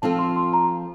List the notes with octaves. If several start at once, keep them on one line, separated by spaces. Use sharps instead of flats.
F3 C4 F4 A4 A5
C6
C6
A#5